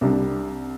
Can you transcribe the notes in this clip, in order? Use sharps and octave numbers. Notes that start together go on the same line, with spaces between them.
C2 C3 G3 D4